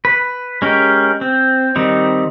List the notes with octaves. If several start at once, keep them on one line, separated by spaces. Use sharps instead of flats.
B4
G#3 C#4 G4 A#4
C4
D#3 G3 C4 D#4